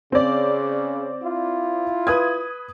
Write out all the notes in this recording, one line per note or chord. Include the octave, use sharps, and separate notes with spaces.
C#3 C4 D5
E4 F4
B4 D#6 G#6